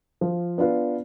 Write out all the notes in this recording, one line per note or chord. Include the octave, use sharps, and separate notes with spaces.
F3
B3 D4 F4 B4